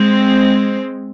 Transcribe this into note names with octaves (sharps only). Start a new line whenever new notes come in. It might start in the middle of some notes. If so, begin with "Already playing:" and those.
Already playing: G#3 C4